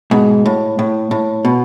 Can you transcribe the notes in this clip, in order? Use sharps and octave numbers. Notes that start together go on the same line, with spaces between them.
G#2 B2
A2
A2
A2
B2